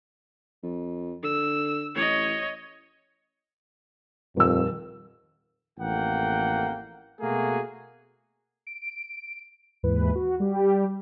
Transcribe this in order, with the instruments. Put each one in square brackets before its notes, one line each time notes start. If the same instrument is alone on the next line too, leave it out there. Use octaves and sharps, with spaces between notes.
[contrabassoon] F2
[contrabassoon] D3 [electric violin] E6
[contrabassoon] A1 [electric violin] C#5 D#5
[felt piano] D#1 E6 [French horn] F2
[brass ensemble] A1 F2 A#3 F#5 G5
B2 A3 A#3 F#4 G#4
[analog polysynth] D7
D#2 G#2 E3 B4
F#4
G3 G4